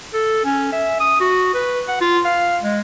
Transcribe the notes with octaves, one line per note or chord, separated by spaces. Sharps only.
A4
C#4
E5
D#6
F#4
B4
F#5
F4
F5
G#3